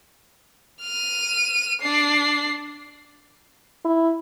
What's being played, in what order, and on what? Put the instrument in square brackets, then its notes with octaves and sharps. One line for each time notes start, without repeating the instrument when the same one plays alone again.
[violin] F6 D#7
D4 C7
[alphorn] E4